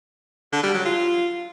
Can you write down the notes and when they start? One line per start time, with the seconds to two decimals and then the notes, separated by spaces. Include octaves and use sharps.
0.52 D3
0.63 G3
0.74 F#3
0.85 F4